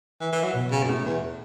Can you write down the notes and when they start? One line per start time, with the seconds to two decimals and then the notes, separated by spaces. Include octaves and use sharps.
0.21 E3
0.32 E3
0.43 F#3
0.54 B2
0.71 C#3
0.83 F#2
0.89 A2
1.05 E2